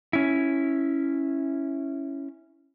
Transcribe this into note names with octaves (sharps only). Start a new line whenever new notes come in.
C#4 E4